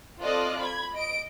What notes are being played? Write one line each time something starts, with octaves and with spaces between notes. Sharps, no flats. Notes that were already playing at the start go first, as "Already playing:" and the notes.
C4 F4 A4 D5 D#5 F#6
B5 G#6
D#5 D7